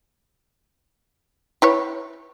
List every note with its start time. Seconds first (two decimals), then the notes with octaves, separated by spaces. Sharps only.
1.62 E4 B4 C#5